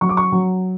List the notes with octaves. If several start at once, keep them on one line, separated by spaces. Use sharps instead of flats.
F#3 C#6
D6
C#6
F#3